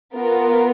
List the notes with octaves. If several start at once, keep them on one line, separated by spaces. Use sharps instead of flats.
B3 F4 A#4